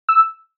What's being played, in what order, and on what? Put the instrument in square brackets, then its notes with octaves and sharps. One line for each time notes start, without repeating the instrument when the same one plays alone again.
[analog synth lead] E6